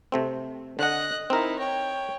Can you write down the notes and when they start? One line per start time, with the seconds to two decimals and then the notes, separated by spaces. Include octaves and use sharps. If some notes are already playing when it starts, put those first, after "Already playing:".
0.12 C3 A3 C4
0.79 D3 D#5 F#5 F#6
1.30 C4 D#4 E4 A#4
1.59 C#5 G5